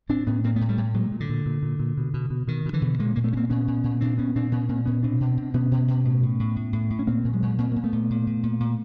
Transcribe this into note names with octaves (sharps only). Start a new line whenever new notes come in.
A2 C4 D4
A2 B3 C#4
A2 A#3 C4
A2 A3 B3
G3 A3
A2
A#2 F#3 G#3
A#2
D3
A#2
A#2
A#2
A#2
B2
B2
B2
B2 D#3
B2
D3 E3
B2
A#2 G#3 A#3
A#2 A#3
A3 B3
A#2 A#3 C4 C#4
A#2 B3 C#4
A#2
A#2
A#2 C4 D4
A#2 B3 C#4
A#2 C4 D4
A#2 B3 C#4
A#2 A#3 C4
A#2 B3 C#4
B2 C4 D4
B2
B2
B2 B3 C#4
B2
B2
A2
A2
A2
A2
A2
A2
C#4
A#2 A#3 C4
A#2
F#3 G#3
A#2
A#2 A#3 C4
A#2 A#3
A3 B3
A#2
A#2
A#2
A#2
A#2